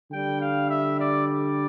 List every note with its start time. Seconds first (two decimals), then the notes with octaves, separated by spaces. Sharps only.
0.11 D3 G3 G5
0.40 F5
0.70 E5
0.99 D5
1.28 D5